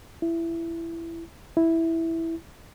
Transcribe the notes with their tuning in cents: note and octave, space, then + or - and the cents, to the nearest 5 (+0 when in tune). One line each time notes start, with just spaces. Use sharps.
E4 +15
E4 -5